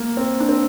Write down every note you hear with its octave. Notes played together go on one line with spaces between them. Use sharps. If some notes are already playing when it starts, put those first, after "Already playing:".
Already playing: A#3
C4
D4
C4